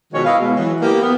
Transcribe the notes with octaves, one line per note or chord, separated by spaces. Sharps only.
B2 D#3 F3 G#3 F#4 C#5
E4 B4 D#5 F5
B2 G#3
E3 F#3
A#3 B3 G4
B3